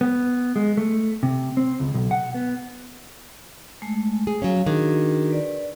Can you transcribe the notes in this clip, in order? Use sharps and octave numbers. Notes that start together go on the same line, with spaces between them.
B3
G#3
A3
C3
C4
C#2
B1
F#5
B3
G#3 A3 G#5
G#4
F#3 C#4 F5
D#3 D4 F#4 G#4
B4 D5